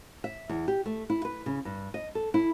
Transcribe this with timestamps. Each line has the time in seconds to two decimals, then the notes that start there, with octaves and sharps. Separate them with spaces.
0.24 E5
0.49 E2
0.68 G4
0.86 A3
1.10 E4
1.25 B4
1.46 C#3
1.65 G2
1.94 D#5
2.15 A4
2.34 E4